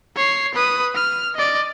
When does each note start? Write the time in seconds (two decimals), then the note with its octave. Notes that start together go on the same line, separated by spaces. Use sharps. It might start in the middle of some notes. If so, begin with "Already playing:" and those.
0.16 C#5 C7
0.54 B4 D#6
0.95 F6
1.35 D5 D#5